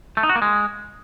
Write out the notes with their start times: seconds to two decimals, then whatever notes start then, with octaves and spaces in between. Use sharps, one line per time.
0.17 A3
0.23 D#4
0.29 F#4
0.36 A#3
0.42 G#3